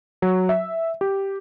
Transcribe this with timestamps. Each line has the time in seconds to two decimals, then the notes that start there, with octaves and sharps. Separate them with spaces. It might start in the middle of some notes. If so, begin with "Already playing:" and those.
0.22 F#3
0.49 E5
1.01 G4